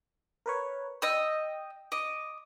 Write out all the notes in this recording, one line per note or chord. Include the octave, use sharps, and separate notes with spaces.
A#4 B4 C#5
D#5 G5 E6
D#5 D6